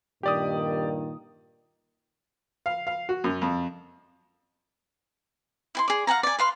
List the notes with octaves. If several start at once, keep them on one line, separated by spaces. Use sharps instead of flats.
G2 A#2 D#3 G4 D5 D#6
F5
F5
F#4
F#2
F2
E4 G#5 C6
G#4 D5
F5 F#5 G#5 A#5
D5 G#5
B4 F5 C6